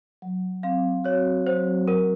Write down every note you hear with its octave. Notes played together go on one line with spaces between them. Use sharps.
F#3
C4 F5
F#4 C#5
F#3 C5
F#3 A#4